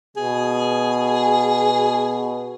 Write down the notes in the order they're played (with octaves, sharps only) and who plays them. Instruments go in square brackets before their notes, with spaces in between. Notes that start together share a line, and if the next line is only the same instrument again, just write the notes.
[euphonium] B2 [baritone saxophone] G#4